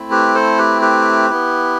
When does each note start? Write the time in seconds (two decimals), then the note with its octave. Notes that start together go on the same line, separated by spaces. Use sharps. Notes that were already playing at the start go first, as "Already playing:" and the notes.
Already playing: A3 C4 E4
0.11 G4 B4
0.35 A4 C5
0.58 G4 B4
0.82 G4 B4
1.30 B3 E4